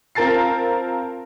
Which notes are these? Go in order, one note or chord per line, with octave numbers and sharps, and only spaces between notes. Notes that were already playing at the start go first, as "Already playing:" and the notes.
C4 F4 A#4 A5 A6 C7